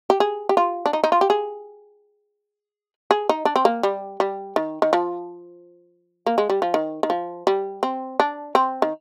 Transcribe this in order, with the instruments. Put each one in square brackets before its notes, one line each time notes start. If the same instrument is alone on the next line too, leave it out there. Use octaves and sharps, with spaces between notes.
[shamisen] G4
G#4
G4
F4
D4
D#4
D#4
F4
G4
G#4
G#4
D#4
D4
C4
A#3
G3
G3
D#3
D#3
F3
A#3
G#3
G3
F3
D#3
D#3
F3
G3
C4
D4
C4
D#3